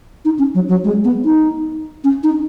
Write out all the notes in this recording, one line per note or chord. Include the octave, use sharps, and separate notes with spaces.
D#4
C#4
F#3
F#3
G#3
B3
D#4
C#4
D#4